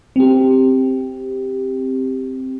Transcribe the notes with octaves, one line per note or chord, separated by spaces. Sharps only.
C4 G4